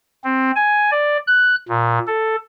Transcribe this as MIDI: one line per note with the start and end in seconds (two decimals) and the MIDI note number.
0.24 0.51 60
0.55 0.90 80
0.91 1.17 74
1.27 1.55 90
1.69 1.99 46
2.07 2.36 69